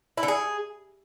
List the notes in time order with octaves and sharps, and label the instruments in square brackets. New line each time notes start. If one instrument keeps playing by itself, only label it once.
[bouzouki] E4
D3
G#4